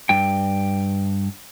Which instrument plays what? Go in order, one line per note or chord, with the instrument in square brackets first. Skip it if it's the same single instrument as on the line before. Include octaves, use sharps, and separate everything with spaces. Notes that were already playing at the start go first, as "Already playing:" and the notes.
[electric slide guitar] G2 G5